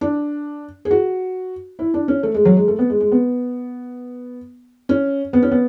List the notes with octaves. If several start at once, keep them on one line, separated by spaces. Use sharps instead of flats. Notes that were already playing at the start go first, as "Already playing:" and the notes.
D4
G#4
F#4
E4
D4
C#4
A3
G#3
F#3
G#3
A3
B3
G#3
G#3
B3
C#4
B3
C#4
B3